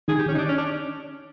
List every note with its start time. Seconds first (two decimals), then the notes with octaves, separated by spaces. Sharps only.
0.08 D#3 G#4
0.19 G4
0.28 C#4
0.34 D#4
0.38 D4
0.49 C#4
0.58 D4